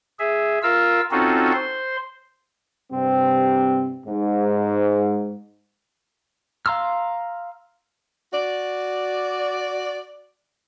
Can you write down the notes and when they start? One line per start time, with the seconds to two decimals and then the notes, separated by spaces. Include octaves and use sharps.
0.19 G#4 E5
0.63 F4 A#4 F5 E6
1.11 C4 C#4 D#4 F4 F#4 A4
1.53 C5 C6
2.92 G2 C3 C4
4.07 G#2
6.66 F5 A#5 C6 E6 F6
8.33 F#4 D5